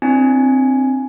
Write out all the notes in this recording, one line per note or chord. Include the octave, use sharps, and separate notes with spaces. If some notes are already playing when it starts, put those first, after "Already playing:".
C4 D4 E4 G#5